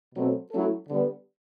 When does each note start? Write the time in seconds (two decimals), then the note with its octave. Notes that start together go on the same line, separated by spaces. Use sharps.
0.15 B2 F#3 A3 C4
0.51 F#3 A3 C#4 E4 A4
0.88 D3 G3 B3